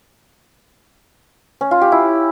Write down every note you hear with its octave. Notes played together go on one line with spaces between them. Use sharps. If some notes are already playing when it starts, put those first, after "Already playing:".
C#4
F4
G4
E4